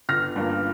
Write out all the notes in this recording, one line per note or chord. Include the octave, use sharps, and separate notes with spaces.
G1 F6 A#6
G2 F3 A#3